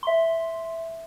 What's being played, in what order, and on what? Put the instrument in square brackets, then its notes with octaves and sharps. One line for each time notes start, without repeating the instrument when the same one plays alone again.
[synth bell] E5 C6